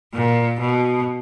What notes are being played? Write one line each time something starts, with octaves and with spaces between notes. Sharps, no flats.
A#2
B2